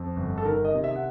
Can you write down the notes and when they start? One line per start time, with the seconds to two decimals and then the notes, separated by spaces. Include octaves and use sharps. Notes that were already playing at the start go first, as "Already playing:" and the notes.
Already playing: F2
0.16 G1
0.38 A4
0.45 D#3 A#4
0.65 D#5
0.74 C3
0.84 E5
0.96 F#5